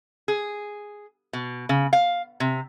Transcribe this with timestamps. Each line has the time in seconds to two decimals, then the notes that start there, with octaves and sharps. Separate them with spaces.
0.28 G#4
1.33 B2
1.69 C#3
1.93 F5
2.40 C3